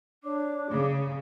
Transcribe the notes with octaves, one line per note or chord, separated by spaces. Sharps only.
D4 C#5 D5 D6
C#3 G#4